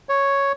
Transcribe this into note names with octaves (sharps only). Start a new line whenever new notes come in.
C#5